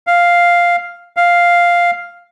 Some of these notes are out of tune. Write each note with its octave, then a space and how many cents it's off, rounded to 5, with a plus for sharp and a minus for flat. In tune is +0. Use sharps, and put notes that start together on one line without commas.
F5 +0
F5 +0